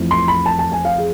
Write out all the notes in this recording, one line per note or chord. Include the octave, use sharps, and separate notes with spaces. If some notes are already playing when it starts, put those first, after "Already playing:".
Already playing: F2 E3 A3 C4
C6
B5
A5
A5
G#5
F5
G#4